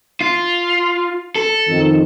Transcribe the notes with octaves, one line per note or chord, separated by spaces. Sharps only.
F4
A4
F2 D#3